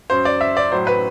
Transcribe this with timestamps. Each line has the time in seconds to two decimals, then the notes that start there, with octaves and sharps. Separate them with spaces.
0.10 F#2 F#3 C5
0.25 D5
0.41 E5
0.57 D5
0.72 A2 F#3 C5
0.87 B4